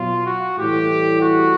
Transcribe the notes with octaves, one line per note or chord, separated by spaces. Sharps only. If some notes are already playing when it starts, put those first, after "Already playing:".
Already playing: B2 F#3 F4
F#4
A2 E3 G3 G4
F#4